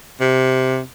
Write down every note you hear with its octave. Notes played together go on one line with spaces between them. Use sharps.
C3